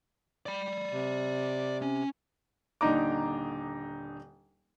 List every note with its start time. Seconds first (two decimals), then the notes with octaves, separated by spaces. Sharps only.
0.46 D5 B5
0.92 C3
1.82 C#4
2.81 D#1 D3 D4 D#4 A#5 D6